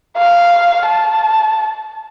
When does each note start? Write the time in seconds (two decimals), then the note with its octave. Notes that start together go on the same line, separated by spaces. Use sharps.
0.17 F5
0.86 A5